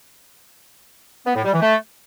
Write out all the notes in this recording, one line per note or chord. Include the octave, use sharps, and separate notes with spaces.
B3
A2
G3
E3
A3